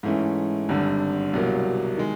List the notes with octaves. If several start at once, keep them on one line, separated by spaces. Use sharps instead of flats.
G#2 E3 A3 C#4
G#1 G2 D3
C2 B2 F#3 A#3
D#3 G#3